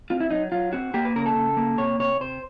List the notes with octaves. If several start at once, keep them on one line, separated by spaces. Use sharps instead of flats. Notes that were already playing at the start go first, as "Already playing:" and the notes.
C4 F4
E4
F#3 D#4
F#3 F4
C4 F#4
A#3 G4
B4
C#3 A#4
A4
C#3
A#3
C3 C#5
C3 C#5
C3 C5